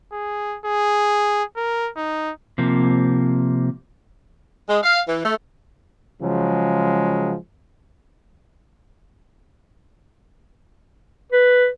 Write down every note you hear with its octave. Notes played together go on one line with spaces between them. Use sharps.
G#4
G#4
A#4
D#4
C3 F3 A#3
G#3
F5
E3
A3
C#3 F3 F#3 G#3
B4